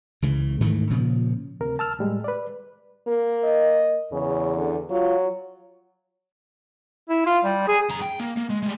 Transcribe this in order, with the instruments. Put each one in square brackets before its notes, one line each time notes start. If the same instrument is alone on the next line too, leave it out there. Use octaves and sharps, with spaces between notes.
[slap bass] C#2 C#3 E3
G#2 D#3 E3 A3
A#2 C#3 F3
[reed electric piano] D2 C3 A#4
A5 E6 F6
A2 G3 G#3
B4 D5
[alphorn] A#3
[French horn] D#5
[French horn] E2 [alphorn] C#3
[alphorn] D3
[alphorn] F#3 [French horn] F4
[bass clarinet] E4
F4
G3
G#4
[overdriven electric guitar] F#2 A#5
G5
A#3
A#3
G#3
G3 G#3